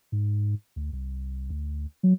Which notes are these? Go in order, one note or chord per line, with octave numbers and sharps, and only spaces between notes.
G#2
D2
C2
D2
F#3